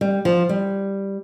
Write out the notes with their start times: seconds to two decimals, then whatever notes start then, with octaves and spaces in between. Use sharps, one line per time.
0.01 G3
0.25 F3
0.49 G3